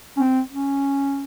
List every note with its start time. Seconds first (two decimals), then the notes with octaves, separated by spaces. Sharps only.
0.17 C#4
0.20 C4
0.51 C#4